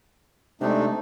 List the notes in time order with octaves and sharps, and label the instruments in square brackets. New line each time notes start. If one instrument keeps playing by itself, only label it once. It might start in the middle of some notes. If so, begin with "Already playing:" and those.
[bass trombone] C3 [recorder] G#3 [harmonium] A3 D4 D#4